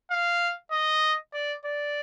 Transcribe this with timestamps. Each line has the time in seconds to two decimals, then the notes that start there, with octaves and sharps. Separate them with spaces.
0.11 F5
0.71 D#5
1.33 D5
1.65 D5